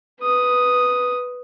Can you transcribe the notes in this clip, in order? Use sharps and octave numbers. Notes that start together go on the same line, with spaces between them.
B4 D#6